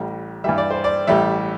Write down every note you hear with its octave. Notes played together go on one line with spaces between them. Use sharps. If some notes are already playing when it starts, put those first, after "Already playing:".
Already playing: A1 A2 G3
G2 E3 G3 E5
D5
C5
D5
A1 A2 G3 E5